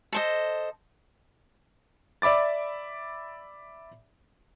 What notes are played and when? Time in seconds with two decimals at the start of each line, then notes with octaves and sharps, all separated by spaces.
0.13 A4 C5 D#5
2.22 D5 E5 B5 D6 A6